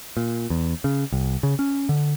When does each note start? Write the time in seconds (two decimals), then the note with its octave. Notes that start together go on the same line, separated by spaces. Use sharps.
0.17 A#2
0.50 E2
0.84 C#3
1.12 C2
1.43 C#3
1.59 C#4
1.89 D3